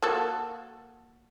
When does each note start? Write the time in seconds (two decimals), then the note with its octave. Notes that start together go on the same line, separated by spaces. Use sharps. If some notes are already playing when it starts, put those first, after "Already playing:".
0.02 A#3 F#4 A4